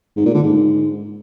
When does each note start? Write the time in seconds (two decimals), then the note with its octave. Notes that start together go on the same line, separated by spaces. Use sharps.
0.16 G#2
0.25 A#2
0.34 D3
0.43 G#2